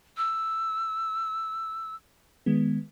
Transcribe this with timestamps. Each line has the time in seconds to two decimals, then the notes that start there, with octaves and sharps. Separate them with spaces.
0.17 E6
2.46 D#3 G#3 B3